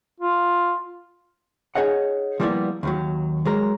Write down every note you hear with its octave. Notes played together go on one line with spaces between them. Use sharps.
F4
D#4 E4 G#4 C#5 D#5 F#5
F3 G3 A#3 B3 E4 D5
D#2 D#3 F#3
F#3 G#3 A#4